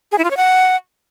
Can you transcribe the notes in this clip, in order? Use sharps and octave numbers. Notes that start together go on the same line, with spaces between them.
G#4
E4
F4
C#5
F#5